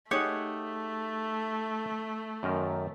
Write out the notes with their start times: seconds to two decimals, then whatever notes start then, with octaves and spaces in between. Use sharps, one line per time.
0.11 A3 D#4 G4 G#4 C#5 F#5
2.43 F#2 D#3 A#4